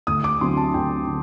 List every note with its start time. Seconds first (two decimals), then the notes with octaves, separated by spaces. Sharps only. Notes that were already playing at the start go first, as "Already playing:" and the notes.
0.07 D2 D#6
0.24 D6
0.41 D3 F#3 C4 C6
0.57 A5
0.74 D2 G5
1.07 D3